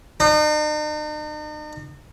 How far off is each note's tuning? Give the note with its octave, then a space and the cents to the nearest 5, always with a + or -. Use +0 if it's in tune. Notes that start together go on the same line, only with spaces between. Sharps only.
D#4 -45